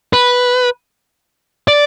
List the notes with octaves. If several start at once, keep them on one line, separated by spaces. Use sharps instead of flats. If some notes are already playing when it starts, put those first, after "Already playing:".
B4
D5